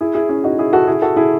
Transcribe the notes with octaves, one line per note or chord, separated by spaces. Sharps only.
E4 G#4
E4 G#4
C#4 E4
D#4 F#4
E4 G#4
F#4 A4
E4 G#4
F#4 A4
E4 G#4